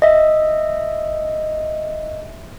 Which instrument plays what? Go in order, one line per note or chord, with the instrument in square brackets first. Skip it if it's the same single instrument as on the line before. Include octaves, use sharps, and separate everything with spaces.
[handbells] D#5 E5